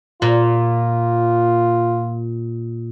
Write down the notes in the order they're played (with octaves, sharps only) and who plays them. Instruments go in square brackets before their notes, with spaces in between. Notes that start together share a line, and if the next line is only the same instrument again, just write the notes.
[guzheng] A#2 [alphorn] F4